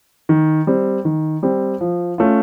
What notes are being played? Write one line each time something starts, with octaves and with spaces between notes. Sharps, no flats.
D#3
G3 C4
D#3
G3 C4
F3
A3 C#4 F4